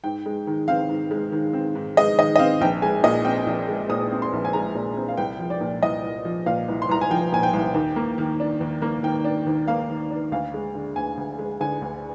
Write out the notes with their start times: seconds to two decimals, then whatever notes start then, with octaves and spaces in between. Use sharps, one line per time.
0.04 G#2 G5
0.26 G#3
0.47 D#3
0.68 C4 F5
0.89 G#2
1.11 G#3
1.32 D#3
1.53 C4
1.75 G#2
1.97 G#3 D#5
2.18 D#3 D#5
2.36 D#5
2.39 C4 F5
2.61 A#1 G5
2.82 G#3 G#5
3.03 A#2 D#5
3.25 C4 G5
3.46 A#1
3.68 G#3
3.89 A#2 D#6
4.11 C4
4.22 C6
4.33 A#1
4.45 G#5
4.53 G#3 A#5
4.75 A#2
4.97 C4
5.08 F5
5.17 C2 G5
5.39 F3
5.50 D5
5.61 A#2
5.82 C2 D#5
6.04 C2
6.25 F3
6.46 A#2 F5
6.69 C2
6.82 C6
6.89 C2 A#5
7.01 G#5
7.10 F3 G5
7.32 A#2 G#5
7.43 G5
7.53 C2
7.74 D#2
7.96 A#3
8.18 D#3
8.40 D4
8.61 D#2
8.82 A#3
9.03 D#3 G5
9.24 D4
9.47 D#2
9.68 A#3 F5
9.89 D#3
10.11 D4
10.32 D2 F5
10.54 G#3
10.75 D3
10.96 D2 G#5
11.17 D2
11.39 G#3
11.61 D3 G#5
11.82 D2